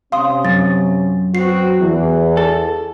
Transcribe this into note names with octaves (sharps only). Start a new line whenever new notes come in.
C3 C#4 F5 C6 D#6
F#2 A6
B3 C4 F#4 C7
E2 E3
A4